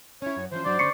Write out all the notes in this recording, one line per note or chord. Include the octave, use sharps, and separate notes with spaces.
C#4 E4 C#5
F#2
E3 F3 C#4 C5
G2 F#3 D4 D5
D3 G#3 C#4 C#6 C7 C#7